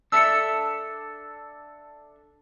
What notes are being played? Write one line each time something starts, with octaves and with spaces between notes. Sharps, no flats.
D4 A4 E5 E6 C#7